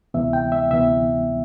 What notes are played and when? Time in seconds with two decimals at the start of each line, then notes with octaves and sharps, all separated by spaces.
0.14 D2 C3 E3 B3 E5
0.33 G5
0.52 E5
0.71 D2 C3 E3 B3 E5